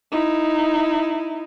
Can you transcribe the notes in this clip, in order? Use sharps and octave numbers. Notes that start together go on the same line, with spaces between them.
D#4 E4